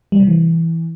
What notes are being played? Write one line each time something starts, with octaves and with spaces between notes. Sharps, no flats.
G3
C3
E3